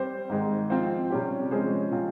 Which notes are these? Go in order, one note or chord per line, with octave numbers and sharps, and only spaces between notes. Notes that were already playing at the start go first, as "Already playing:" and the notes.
Already playing: G3 C4 G4 C5
G#2 D#3 G#3
F3 C4 F4 C5
C3 G3 C#4 G4
F3 G#3 C#4 G#4 C5
C3 F3 C4 F4